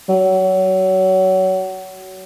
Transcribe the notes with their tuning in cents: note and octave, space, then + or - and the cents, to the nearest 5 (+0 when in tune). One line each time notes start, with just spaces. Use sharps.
F#3 +25